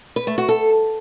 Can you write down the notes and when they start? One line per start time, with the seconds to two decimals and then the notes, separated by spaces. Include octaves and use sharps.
0.16 B4
0.27 A3
0.38 F#4
0.49 A4